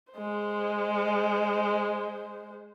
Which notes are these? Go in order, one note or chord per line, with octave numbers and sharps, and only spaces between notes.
G#3 C5